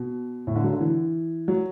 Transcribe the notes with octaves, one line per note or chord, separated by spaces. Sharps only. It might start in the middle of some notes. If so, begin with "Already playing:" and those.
Already playing: B2
A2
D3
F#3
D3
E3
F#3